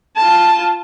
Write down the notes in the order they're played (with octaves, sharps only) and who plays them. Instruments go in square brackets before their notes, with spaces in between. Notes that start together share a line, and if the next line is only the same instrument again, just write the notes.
[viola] F4 A5